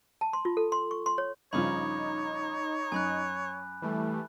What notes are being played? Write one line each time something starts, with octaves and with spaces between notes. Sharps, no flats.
A5
C6
F4
A4
C6
C#6
C6
C#5
G2 C#3 F3 D#4 C#5 B5 D6
F#2 G#5 B5 F#6
E3 G3 A3